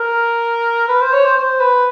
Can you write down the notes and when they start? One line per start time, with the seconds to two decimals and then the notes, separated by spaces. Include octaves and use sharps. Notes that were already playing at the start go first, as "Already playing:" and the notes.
Already playing: A#4
0.88 B4
1.01 C5
1.13 C#5
1.25 C5
1.37 C5
1.60 B4